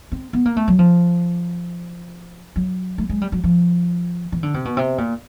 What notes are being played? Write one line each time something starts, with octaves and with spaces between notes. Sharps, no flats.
C4
B3
A#3
A3
F#3
F3
F#3
A3
G#3
G3
F#3
F3
E3
D3
C3
B2
C3
A#2